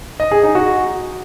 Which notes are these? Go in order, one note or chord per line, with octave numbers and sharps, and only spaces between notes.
D#5
G#4
D#4
F#4